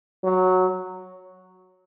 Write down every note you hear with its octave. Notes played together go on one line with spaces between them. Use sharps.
F#3